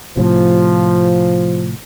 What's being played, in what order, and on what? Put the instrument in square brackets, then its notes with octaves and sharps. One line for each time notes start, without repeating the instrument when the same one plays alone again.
[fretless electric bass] A2 C3 [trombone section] F3